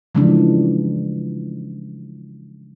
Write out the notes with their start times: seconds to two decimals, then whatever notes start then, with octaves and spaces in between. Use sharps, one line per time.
0.15 C#3 E3 F3 G#3 A3 D4